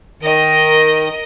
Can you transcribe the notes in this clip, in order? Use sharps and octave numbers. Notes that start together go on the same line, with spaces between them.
D#3 A#4 D#5